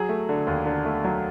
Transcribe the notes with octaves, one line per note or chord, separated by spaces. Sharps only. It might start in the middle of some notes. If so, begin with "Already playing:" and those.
Already playing: F#3 G#4
A3
D3
D#2
D3
A3
F#3